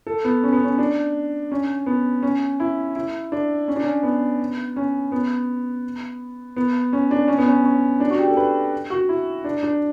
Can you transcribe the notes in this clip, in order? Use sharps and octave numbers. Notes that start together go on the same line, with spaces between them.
A4
B3
C#4
B3
C#4
D4
C#4
B3
C#4
E4
E4
D4
C#4
D4
C#4
B3
C#4
B3
B3
C#4
D4
C#4
B3
C#4
C#4
D4
F#4
G4
A4
B4
F#4
E4
D4
D4